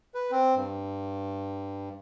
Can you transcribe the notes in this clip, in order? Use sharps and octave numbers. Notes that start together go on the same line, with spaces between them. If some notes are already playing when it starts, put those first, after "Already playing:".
B4
C4
G2